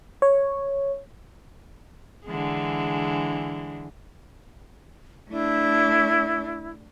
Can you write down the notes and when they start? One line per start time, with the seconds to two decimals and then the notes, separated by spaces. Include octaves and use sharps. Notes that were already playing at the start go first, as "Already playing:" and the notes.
0.22 C#5
2.26 D3 E3 G#3
5.30 A3 D4 E4